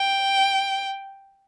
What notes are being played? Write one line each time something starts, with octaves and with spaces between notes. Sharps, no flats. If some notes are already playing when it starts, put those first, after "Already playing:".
Already playing: G5